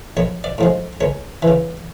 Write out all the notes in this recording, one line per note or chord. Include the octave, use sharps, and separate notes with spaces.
A#1 C#5
D5
A2 F3 G#3
C#2 C#5
E3
C#3